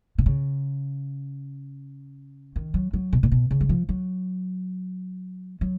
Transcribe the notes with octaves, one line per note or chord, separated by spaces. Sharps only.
B2
C#3
D#3
F#3
F#3
B2
A#2
B2
C#3
F#3
F3
F#3
F#3